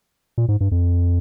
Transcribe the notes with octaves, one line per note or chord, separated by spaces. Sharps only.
A#2
G#2
G2
F2